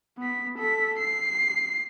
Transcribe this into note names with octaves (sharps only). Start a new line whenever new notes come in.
B3 B6
A4 B6
C7